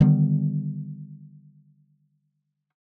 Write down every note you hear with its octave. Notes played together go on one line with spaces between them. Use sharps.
D3 D#3 G3 B3